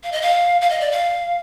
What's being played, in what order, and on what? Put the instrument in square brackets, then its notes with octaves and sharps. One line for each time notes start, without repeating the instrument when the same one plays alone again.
[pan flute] F5
D#5
F5
F5
D#5
D5
F5